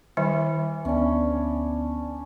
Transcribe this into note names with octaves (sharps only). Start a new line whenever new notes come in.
D#3 E3 G3
D2 B3 C#4 D4 D5